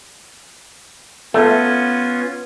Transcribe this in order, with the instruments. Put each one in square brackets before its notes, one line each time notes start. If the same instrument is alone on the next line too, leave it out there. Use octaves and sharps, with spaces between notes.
[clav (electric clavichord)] A3 [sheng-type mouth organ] B3 C#4 F4